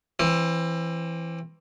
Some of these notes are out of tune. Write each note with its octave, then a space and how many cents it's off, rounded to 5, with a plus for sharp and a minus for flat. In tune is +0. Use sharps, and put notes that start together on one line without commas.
E3 +15 C4 +30